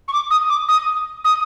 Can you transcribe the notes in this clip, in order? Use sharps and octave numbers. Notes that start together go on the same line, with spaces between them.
C#6
D6
D#6
D6
D#6
D#6